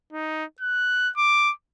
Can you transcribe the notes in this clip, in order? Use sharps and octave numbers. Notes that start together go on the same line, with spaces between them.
D#4
F#6
D6